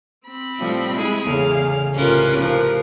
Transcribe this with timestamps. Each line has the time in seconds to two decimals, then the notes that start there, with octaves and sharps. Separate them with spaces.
0.25 C4 B5
0.59 A2 F3 G3
0.93 G#3 E4 G#4
1.27 A1 E2 C#3 G#3 G#4 F5
1.95 C2 A2 C#4 F4 G4 A#4 B4
2.40 F3 A#4 C#6